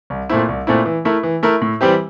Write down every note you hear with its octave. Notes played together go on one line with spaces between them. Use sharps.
C2
A#2 A3 C4 E4
C2
A#2 A3 C4 E4
E3
A3 E4 A#4
E3
A3 E4 A#4
A2
E3 G3 C4 G4